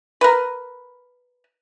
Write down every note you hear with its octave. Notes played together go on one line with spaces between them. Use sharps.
A#4 B4